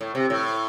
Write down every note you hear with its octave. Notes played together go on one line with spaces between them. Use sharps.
A2
C3
A2